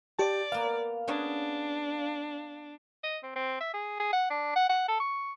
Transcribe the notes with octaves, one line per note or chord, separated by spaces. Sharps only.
G4 D5 A5
A#3 B3 F5
B3 C#4 D4 G#4
D#5
C4
C4
E5
G#4
G#4
F#5
D4
F#5
F#5
A4
C#6